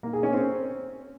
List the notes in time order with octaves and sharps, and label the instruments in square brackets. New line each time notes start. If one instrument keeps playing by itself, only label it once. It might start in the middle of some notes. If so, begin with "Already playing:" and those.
[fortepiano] A#3
G#4
C#4
C4